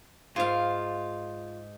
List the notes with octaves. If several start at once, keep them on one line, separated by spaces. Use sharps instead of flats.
G#2 F4 F5